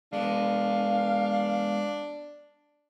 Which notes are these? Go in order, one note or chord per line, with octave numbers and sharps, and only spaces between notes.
G#3 B3 D4 F5